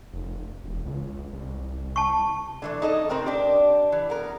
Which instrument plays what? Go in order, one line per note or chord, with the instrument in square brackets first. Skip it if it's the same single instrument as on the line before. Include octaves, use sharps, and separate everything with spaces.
[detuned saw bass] F1
E1
C#2
C2
[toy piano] A5 C#6
[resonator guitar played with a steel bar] D3 E3 A3
D#4 A4 D#5
C3 A3 C4 A#4
D4 G4
E3
B3 A#4